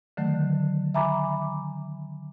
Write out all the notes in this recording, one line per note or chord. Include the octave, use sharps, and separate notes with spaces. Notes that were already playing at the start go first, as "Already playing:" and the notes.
D3 D#3 F#3 A3
E5 G#5 A#5 B5 D6